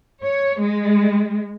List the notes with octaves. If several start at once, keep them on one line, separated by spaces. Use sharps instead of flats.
C#5
G#3